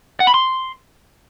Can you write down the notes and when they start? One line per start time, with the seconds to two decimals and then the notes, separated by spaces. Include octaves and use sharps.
0.20 F#5
0.27 B5
0.34 C6